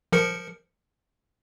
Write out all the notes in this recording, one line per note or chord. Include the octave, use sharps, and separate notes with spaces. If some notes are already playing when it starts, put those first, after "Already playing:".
F3 A#4 C#7